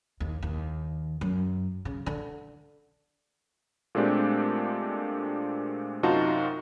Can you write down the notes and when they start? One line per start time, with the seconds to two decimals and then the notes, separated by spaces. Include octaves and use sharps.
0.20 D#2
0.43 D#2
1.21 F#2
1.85 C#3
2.06 D3
3.95 A#2 G#3 A3 C4 D4 G4
6.03 F#2 C3 D#4 F4 F#4 A5